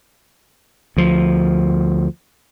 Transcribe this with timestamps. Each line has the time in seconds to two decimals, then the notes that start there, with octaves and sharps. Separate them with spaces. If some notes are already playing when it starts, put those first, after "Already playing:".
0.97 D2 F3